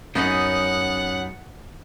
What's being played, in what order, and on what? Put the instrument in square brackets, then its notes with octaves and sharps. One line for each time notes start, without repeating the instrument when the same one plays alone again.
[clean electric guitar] F#2 B3 D#4 [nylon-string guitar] C#4 [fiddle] F#5